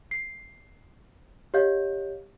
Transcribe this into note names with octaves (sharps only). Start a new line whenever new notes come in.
C7
G4 C#5 D#5 F5 G6